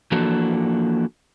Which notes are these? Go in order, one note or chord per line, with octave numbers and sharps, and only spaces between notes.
E3 F3 A#3 D4 F#4 A4